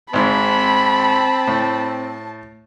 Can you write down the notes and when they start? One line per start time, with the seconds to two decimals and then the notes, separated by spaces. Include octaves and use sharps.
0.13 G#1 G#2 C4 A5 B5
1.47 A2